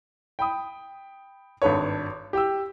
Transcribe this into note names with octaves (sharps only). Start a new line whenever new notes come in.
G5 B5 D#6
G#1 G2 A4 B4 C#5
G4 G5 E6